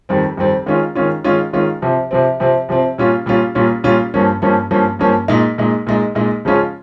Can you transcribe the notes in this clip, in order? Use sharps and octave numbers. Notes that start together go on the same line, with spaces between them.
F2 D#3 G3 C4
F2 D#3 G3 C4
D#3 G#3 C#4 F4
D#3 G#3 C#4 F4
D#3 G#3 C#4 F4
D#3 G#3 C#4 F4
C3 F3 C4
C3 F3 C4
C3 F3 C4
C3 F3 C4
A#2 G3 C#4 F4
A#2 G3 C#4 F4
A#2 G3 C#4 F4
A#2 G3 C#4 F4
G2 F3 A#3 C#4
G2 F3 A#3 C#4
G2 F3 A#3 C#4
G2 F3 A#3 C#4
A#2 G#3 D#4
A#2 G#3 D#4
A#2 G#3 D#4
A#2 G#3 D#4
C#3 F3 G#3 C#4 F4